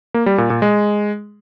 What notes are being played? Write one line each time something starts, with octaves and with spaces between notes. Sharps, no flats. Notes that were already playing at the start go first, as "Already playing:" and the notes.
A#3
G3
A#2
A#2
G#3